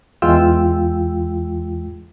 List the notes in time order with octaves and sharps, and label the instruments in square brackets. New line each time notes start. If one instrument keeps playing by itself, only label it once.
[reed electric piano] E2 E3 G#3 F4 G5 E6